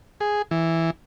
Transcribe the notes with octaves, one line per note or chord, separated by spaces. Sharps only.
G#4
E3